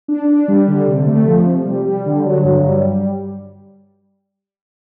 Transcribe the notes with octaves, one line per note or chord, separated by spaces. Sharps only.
D4
D4
G3
D3
C3
A3
F3
C3
G3
G3
D3
F#3
G2
G3